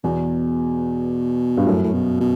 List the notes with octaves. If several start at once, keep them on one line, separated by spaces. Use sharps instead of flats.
E2 B2
G2
F#2 A2
A2
B2
B2